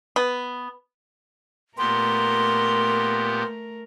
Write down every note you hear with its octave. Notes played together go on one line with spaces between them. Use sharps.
B3
A#2 A3 B3 G4 A#4 C6